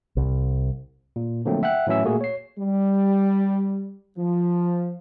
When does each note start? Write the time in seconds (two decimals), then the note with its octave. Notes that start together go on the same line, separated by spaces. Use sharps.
0.17 C2
1.16 A#2
1.45 D3 F3 F#3 A3 A#3 C4
1.63 E5 F#5 G5 F#6
1.87 A2 E3 F#3 C#4 E5 E6
2.04 A#2 A3 A#3 F#4 G#4
2.21 C#5 C7
2.59 G3
4.18 F3